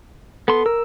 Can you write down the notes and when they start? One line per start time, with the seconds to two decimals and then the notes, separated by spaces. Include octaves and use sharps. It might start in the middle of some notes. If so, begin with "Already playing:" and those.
0.48 B3 A4 C6
0.66 A#4 E6